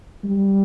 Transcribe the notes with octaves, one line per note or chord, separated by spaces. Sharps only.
G3